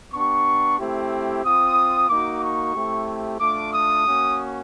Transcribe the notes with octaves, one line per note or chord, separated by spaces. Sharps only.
B3 D4 G4 C#6
A3 C4 E4 G4
C4 F4 D#6
A#3 D#4 F#4 D6
C#6
A3 C4 E4 G4
A3 D4 F4 D6
D#6
A#3 C#4 F#4